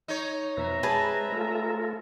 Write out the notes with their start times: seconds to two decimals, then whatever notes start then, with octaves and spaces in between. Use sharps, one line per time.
0.08 D#4 C#5
0.57 F2 B2 C4 B4 E5 A#5
0.83 G#3 G#4 B4 A5
1.32 A3 F4 A4